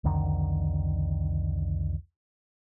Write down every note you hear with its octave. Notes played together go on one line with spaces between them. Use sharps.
C2 F2 D3 D#3